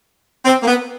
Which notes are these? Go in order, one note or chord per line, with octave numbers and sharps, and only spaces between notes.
C4
A#3
B3